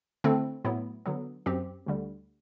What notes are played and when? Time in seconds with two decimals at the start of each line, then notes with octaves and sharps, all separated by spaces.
0.24 D3 A3 C4 E4 A4
0.64 A2 F#3 B3 E4
1.06 D3 F#3 B3
1.46 F#2 F#3 C4 G4
1.86 D2 D3 G3